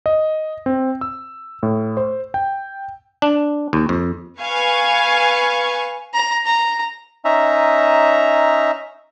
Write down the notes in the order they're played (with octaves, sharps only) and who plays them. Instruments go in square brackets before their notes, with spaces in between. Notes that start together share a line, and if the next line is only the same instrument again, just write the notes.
[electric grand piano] D#5
C4
E6
A2
C5
G5
[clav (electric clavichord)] D4
D#2
F2
[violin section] B4 F5 G#5 C#6
[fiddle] A#5
A#5
[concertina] C#4 D#4 E5 A#5